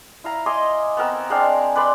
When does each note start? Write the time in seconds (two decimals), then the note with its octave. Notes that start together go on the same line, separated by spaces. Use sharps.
0.24 E4 F5 A#5
0.46 D#5 G#5 C6 D6
0.97 B3 C4 A#4 E6
1.30 G#3 C4 D4 F5
1.76 B4 D5 B5 C6